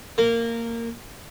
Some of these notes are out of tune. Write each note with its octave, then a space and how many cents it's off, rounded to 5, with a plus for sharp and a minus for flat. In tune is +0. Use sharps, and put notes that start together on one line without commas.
A#3 -15